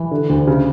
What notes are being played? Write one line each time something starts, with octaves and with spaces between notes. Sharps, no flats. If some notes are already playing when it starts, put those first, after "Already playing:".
Already playing: E3
D3
D2
C#3